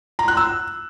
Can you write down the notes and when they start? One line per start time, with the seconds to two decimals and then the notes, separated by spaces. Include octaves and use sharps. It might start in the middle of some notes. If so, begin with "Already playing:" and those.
0.19 A#5
0.28 F#6
0.37 E6